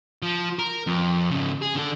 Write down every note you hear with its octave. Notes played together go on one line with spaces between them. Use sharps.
F3
A#4
F2
G#2 C#3
G#4
D3 A4